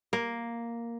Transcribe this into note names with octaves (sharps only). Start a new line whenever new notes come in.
A#3